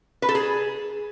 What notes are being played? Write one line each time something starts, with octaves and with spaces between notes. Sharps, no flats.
B4
A4
G#4